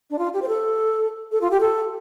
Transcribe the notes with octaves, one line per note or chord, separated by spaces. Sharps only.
D4
F4
G4
C5
A4
A4
F4
G4
A4